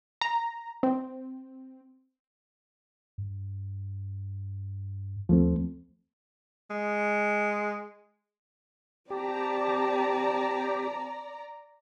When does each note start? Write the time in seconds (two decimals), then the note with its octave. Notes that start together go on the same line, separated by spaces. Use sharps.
0.21 A#5
0.83 C4
3.18 G2
5.29 D#2 F3 A3 C4
6.70 G#3
9.10 C4 G4 D5 A5 A#5